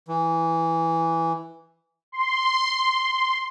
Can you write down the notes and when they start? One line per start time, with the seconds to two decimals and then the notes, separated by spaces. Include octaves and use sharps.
0.08 E3
2.12 C6